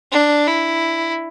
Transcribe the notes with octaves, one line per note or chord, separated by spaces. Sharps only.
D4
E4